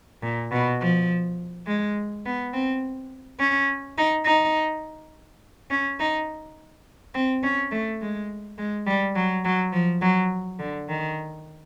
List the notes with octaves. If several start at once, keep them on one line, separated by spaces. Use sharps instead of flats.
A#2
B2
F3
G#3
B3
C4
C#4
D#4
D#4
C#4
D#4
C4
C#4
A3
G#3
G#3
G3
F#3
F#3
F3
F#3
D3
D#3